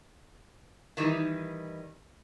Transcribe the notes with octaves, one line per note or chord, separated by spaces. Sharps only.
D#3 E3 G3 D#4